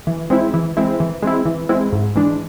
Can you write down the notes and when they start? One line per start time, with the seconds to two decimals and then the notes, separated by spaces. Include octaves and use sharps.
0.07 E3
0.30 G#3 C4 E4
0.54 E3
0.77 G#3 C4 E4
1.00 E3
1.22 G#3 C4 E4
1.46 E3
1.69 G#3 C4 E4
1.93 G#2
2.15 E3 G#3 D4